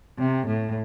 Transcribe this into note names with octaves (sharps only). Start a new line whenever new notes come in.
C3
A2